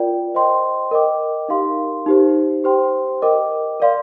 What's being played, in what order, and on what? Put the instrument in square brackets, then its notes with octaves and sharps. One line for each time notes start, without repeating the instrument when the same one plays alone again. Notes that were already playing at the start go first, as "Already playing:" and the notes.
Already playing: [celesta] F4 A#4 D5 G5
C5 D#5 G5 C6
A#4 D#5 G5 D6
D#4 G4 A#4 F5 C6
D#4 G4 C5
G4 C5 G5 C6
A#4 D#5 G5 D6
A#4 D5 F5 C6